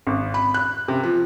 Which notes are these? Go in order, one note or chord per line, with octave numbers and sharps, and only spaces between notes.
G#1
B5
F#6
C3
F3